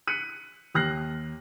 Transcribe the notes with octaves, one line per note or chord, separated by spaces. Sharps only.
F#6 B6 C#7 D#7
D#2 F6 F#6 A#6 C7